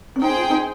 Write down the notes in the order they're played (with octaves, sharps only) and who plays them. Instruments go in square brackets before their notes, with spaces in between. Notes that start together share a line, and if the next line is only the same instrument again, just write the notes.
[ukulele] C#4
[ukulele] D#4 [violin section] G#4 C5 G5
[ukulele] F4
D#4